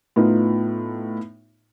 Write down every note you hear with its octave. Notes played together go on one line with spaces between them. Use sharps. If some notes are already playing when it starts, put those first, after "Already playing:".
A2 B3 D#4 F4